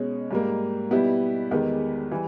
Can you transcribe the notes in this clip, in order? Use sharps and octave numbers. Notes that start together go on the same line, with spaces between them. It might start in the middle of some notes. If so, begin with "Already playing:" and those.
Already playing: B2 G#3 C#4
G#2 G3 A#3
B2 G3 B3 E4 G4
E2 D#3 G#3 B3 G4
E3 G3